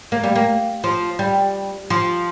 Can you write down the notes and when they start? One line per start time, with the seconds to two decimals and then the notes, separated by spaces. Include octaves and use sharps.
0.12 A#3
0.23 G3
0.35 A#3
0.84 F3
1.19 G3
1.90 F3